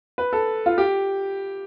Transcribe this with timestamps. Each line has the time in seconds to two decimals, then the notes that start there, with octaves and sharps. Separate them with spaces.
0.18 B4
0.33 A4
0.66 F4
0.78 G4